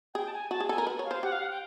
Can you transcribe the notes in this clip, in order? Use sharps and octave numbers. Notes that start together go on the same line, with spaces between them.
G#4 G5
A5
G#5
F#4 A5
G#4
A4 G#5
A#4
B4
C#5
F5
C5
G4 F#5
F5
F#5
G5